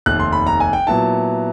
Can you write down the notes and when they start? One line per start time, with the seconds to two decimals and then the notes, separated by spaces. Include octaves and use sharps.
0.06 F1 D#2 D#3 F#6
0.20 C6
0.33 B5
0.47 A#5
0.60 G#5
0.73 G5
0.87 A#2 F#3 B3 E4 A5